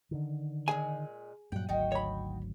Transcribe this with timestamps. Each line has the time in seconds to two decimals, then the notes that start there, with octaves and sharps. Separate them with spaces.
0.11 D3 D#3
0.68 A#2 G#3 G#4 G#5
1.52 G2 A#2 F#3 F#5 G5
1.69 G#1 D2 F#3 D#4 F#4 G5
1.92 C#5 B5